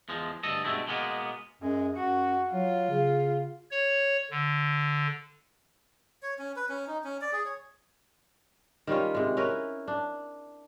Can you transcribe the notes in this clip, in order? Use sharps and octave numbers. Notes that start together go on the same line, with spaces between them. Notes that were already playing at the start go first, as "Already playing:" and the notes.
E2 F3 G#3
D2 G2 A4 D#5
G2 B2 G#3 A3 E4
B2 G#3 A#3 B3
F#2 G#3
F#2 F#4
F#3 F4
C#3
C#5
D3
C#5
C#4
B4
C#4
D#4
C#4
D5
G#4
C#5
D#3 G3 C#4 F4
C3 G#3
C#4 E4 A#4 B4
D4